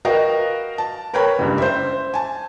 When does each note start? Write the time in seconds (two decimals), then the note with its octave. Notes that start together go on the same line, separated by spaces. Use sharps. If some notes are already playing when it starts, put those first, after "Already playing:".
0.05 F#4 A#4 B4 D#5 F5 G5
0.78 A5
1.14 A#4 B4 C#5 G5 A#5 B5
1.39 F#1 C#2 G2
1.58 C5 E5
2.14 G#5 A5